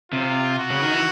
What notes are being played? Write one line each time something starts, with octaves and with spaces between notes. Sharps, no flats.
C3 F4
F#4
C#3
D#3
E3